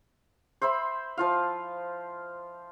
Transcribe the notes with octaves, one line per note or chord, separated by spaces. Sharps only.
C5 E5 B5 C6
F3 F4 F5